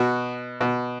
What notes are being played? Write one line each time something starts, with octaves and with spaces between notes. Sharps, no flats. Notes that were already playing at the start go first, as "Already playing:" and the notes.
Already playing: B2 F#4
B2